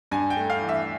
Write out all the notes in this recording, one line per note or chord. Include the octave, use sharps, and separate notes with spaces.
G2 G#5
G5
A3
F5
E3
E5